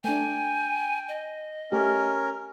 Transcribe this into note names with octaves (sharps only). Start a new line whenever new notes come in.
A3 D4 G5 G#5
D#5
A3 C#4 G4 A#4